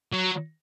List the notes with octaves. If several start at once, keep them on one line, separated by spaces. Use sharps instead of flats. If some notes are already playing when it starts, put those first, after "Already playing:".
F#3